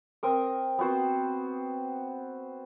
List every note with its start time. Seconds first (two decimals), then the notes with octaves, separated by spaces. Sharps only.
0.23 C4 A#4 D#6
0.79 B3 C4 F#4 C5